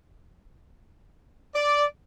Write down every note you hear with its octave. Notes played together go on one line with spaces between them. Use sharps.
D5